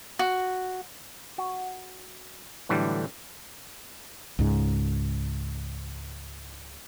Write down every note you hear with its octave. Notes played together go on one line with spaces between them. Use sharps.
F#4
F#4
A2 D3 E3 F#3 G3
C#2 G#2